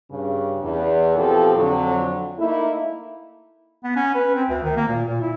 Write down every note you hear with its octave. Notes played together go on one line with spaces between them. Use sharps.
G2 C#3
E2
B2 F3 C4 G4 A4
F2 D3 F#3
A3 A#3 D#4 E4
B3
C#4
B4
C4
D2
D#3
A#3
A#2
A#2
E4